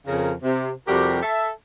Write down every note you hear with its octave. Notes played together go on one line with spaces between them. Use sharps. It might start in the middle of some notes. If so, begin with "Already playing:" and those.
F2 C#3 A#4
C3
F2 C3 G3 F#4 G4 A#4
A4 E5